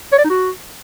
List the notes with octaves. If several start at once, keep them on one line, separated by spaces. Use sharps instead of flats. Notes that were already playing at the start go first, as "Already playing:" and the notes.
C#5
D5
D#4
F#4